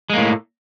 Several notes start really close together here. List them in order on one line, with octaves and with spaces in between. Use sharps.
G#3 A#3 A2